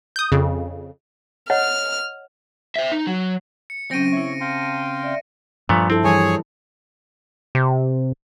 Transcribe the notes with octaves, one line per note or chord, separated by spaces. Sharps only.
D#6 G6
F2 C#3
C#5 D#5 F#5 F6
C5 E5
D#4
F#3
C#7
C#3 F#3 C4 C#4 G5 A#6 D7 D#7
E4 C#5 E5 C#6
F5 G5 A5 C6
D5 E5
G2 A#2 F3 A3 B3
C4 E4 A4
E3 G3 G#4 C#5 G#5
C3